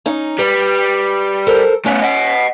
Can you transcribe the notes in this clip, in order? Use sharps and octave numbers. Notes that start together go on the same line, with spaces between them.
C#4 D#4
G3 B4
A4 A#4 C5
A3 B3 C#4
D#5 F#5